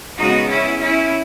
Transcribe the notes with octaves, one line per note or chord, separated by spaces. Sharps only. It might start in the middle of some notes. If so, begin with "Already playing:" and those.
C#3 G#3 B3 D#4 F#4
C#4 E4
C#4 E4